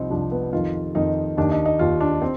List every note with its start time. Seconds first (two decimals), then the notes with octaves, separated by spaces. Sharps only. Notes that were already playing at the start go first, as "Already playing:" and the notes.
Already playing: C2 C3 F3 C4 D#4
0.10 C2 C3 F3 D4
0.32 B3
0.53 F2 D#3 F4
0.95 F2 D#3 D#4
1.37 D#2 D#3 D4
1.51 D#4
1.65 D#4
1.79 D#2 D#3 F4
2.01 D4
2.22 C4